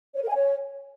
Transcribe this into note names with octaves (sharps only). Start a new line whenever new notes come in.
C#5
A#4
G#5
C#5